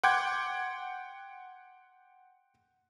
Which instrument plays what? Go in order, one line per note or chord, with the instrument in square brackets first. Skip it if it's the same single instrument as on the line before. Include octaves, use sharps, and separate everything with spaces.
[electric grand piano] F#5 G5 C6 D6 G6 G#6